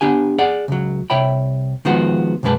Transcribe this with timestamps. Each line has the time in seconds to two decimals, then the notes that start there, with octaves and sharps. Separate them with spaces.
0.01 B3 D4 G4 G#5
0.38 G#4 D5 F#5
0.68 C#2 F#3
1.10 C2 C#5 E5 G5 B5
1.85 D#3 F3 G#3 B3 F#4
2.43 B1 F#2 F#3 G#3 B4 A5